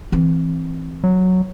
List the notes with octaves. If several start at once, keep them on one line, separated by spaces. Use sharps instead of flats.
E3 C4
F#3